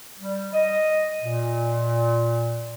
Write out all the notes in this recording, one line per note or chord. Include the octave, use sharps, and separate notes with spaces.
G3
D#5
A#2